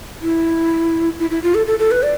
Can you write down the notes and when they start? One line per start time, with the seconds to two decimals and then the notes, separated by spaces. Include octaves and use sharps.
0.22 E4
1.19 E4
1.30 E4
1.43 F4
1.55 A4
1.67 A4
1.79 A4
1.91 B4
2.03 D5